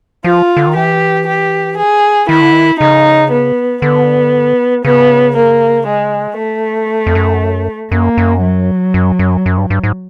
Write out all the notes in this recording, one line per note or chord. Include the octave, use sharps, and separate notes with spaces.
F3 F4
D3
D#3
E3 G4
G4
G#4
D#3 E4
D3
D#3
C#3 D#4
B3
D3 B3
C#3 B3
A#3
G#3
A3
F2
F#2
F#2 A#3
F#2
F#3
F#2
F#2
F#2
G2
G2
G#2